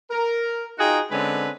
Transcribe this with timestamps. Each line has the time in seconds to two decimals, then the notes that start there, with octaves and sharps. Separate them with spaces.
0.11 A#4
0.79 D#4 F4 F#4 G#4 G5
1.11 D3 G#3 C4 C#4 B4